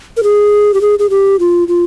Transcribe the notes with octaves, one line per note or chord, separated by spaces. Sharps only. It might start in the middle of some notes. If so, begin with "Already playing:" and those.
A#4
G#4
G4
G#4
G#4
G4
F4
F4